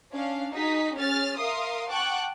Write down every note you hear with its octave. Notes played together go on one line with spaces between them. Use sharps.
C#4 D4 F5
D#4 F#4 G#4 D#6 B6
C#4 G#4 F6 A6
A#4 E5 F5 C6 D#6
F#5 G5 A5 C#6 D6 F#6